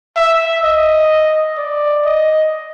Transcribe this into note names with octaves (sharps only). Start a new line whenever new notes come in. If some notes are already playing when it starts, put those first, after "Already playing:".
E5
D#5
D5
D#5